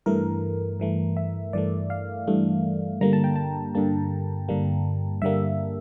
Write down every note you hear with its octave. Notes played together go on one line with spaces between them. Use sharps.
G2 E3 A3 A#4
G2 E3 A3
E5
G2 E3 A3 D5
F5
G2 E3 A3
G2 D3 G3 A#3 A#5
A5
G5
A5
G2 D3 G3 A#3 A5
G2 D3 G3 A#3
G2 D3 G3 A#3 E5